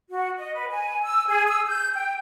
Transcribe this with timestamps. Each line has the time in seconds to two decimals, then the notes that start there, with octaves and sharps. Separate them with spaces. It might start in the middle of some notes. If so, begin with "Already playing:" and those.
0.09 F#4
0.37 D#5
0.55 B4
0.69 G#5
1.02 E6
1.27 G#4
1.48 E6
1.67 G6
1.95 G5